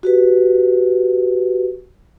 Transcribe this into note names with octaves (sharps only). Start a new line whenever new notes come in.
F#4 G4 B4